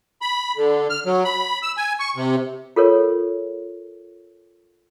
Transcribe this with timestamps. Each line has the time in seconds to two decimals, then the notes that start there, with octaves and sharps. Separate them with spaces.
0.21 B5
0.57 D3
0.90 F6
1.06 F#3
1.25 B5
1.63 E6
1.77 G#5
2.00 C#6
2.16 C3
2.76 F4 A4 A#4 C#5